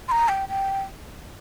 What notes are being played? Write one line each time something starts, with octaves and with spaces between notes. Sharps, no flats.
C6
A#5
G5
G5